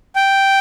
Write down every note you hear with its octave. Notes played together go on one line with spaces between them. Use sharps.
G5